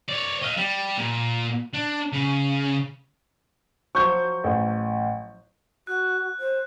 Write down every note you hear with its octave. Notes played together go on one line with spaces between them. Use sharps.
C#5 D5
D#5 F5
G3
A#2
D4
C#3
F3 F#3 C#6 G6
A1
F#4 F#6
C5